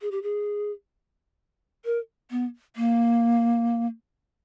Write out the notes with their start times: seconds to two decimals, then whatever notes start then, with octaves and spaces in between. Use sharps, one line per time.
0.02 G#4
0.11 G4
0.23 G#4
1.85 A#4
2.31 B3
2.76 A#3